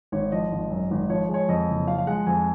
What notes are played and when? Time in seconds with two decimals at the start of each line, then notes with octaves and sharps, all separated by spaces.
0.12 G#1 C#5
0.32 F3 D#5
0.51 G#1
0.70 F#2
0.91 G#1
1.10 F3 C#5
1.29 G#3
1.34 C#5
1.49 F2 D#5
1.68 F#1
1.88 F3 F5
1.98 F5
2.07 G#3 F#5
2.26 F2 G#5